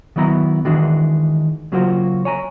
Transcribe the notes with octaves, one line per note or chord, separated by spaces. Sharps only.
D#3 F#3 B3 E4 A#5
D#3 E3 G#3 D4 F#4
C#3 F#3 A#3 F4 F#4 C5
C#5 G#5 A#5